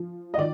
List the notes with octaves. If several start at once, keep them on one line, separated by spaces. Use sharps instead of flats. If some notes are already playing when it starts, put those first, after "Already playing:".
Already playing: F3
D#5
D#3 D5